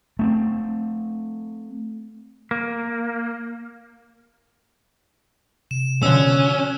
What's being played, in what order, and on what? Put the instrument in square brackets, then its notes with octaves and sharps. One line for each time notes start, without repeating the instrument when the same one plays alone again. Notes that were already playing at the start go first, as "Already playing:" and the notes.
[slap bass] A3 B3 C4
[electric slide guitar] A#3
[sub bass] C3 [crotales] E7
[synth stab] B2 D3 F3 [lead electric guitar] C#4 [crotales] E6 F#6